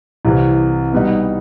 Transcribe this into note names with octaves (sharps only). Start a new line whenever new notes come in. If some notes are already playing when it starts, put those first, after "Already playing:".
C2 C3 E3
B2 G3 B3 D#4